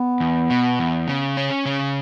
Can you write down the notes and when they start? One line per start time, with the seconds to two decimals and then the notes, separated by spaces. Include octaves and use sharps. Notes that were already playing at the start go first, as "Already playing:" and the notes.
Already playing: B3
0.20 E2
0.50 B2
0.79 E2
1.08 C#3
1.37 C#4
1.66 C#3